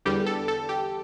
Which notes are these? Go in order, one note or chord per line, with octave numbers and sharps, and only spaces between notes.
E2 D3 G3 G4
A4
A4
G4